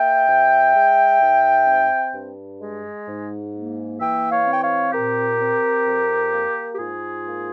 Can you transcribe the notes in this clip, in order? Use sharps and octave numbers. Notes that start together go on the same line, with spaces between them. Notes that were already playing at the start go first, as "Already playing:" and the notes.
Already playing: A#3 E5 G5
F2
G#3
G#2
C4
G2
G#3
G#2
A#3
E3 E5 G5
C#5 F5
C4
G5
C#5 F5
A#2 G4 A#4
C4
F2
A#3
G4
G#2 F4 G#4
A#3